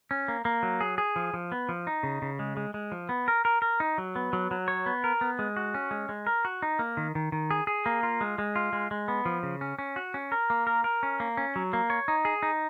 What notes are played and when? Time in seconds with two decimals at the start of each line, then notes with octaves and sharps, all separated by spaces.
0.11 C#4
0.28 A#3
0.45 A#3
0.63 F#3
0.81 G#4
0.98 G#4
1.16 F3
1.34 F3
1.52 B3
1.69 F3
1.87 D#4
2.03 C#3
2.22 C#3
2.39 G#3
2.57 G#3
2.74 G#3
2.92 F3
3.09 B3
3.28 A#4
3.45 A#4
3.62 A#4
3.80 D#4
3.98 F#3
4.16 B3
4.33 F#3
4.51 F#3
4.68 C#5
4.86 B3
5.04 A#4
5.21 B3
5.39 G#3
5.56 F#4
5.74 C#4
5.91 G#3
6.09 G#3
6.27 A#4
6.45 F#4
6.62 D#4
6.79 A#3
6.97 D#3
7.15 D#3
7.32 D#3
7.51 G#4
7.67 G#4
7.86 A#3
8.03 F4
8.21 G#3
8.38 G#3
8.56 F4
8.73 G#3
8.91 G#3
9.08 B3
9.25 F3
9.43 C#3
9.61 C#4
9.79 C#4
9.96 F#4
10.14 C#4
10.32 A#4
10.50 A#3
10.67 A#4
10.84 A#4
11.03 C#4
11.20 A#3
11.37 C#4
11.56 F#3
11.73 A#3
11.90 C#5
12.08 D#4
12.25 G#4
12.43 D#4